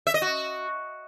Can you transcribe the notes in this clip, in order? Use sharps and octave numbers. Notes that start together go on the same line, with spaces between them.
E5
D#5
F#4